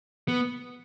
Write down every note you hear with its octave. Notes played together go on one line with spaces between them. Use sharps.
B3